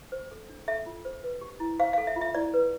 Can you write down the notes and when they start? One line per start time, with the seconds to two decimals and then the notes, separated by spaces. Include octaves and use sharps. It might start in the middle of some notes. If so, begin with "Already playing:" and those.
0.12 C5
0.31 A4
0.49 D4
0.68 A4 E5
0.86 F4
1.05 C5
1.23 B4
1.41 G4
1.60 E4
1.79 C5 F5
1.93 A4 F5
2.07 E5
2.16 F4
2.21 E5
2.35 E4 D5
2.54 B4